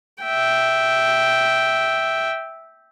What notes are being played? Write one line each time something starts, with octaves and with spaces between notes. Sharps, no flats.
E5 G5